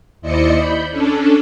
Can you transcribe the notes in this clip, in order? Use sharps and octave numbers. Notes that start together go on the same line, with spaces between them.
D#2 E4 C5 D5 D#5 C#7
B5 G6
C#4 D4 A4